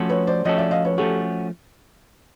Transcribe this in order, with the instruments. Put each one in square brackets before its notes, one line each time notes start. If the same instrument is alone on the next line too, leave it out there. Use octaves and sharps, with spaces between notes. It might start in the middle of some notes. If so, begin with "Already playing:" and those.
Already playing: [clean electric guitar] F3 A3 C#4 F#4 A4
[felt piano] B4 C#5
C5 D5
[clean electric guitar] F3 A3 C#4 F#4 A4 [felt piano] C#5 D#5
[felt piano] D5 E5
D#5 F5
B4 C#5
[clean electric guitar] F3 A3 C#4 F#4 [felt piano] G4 A4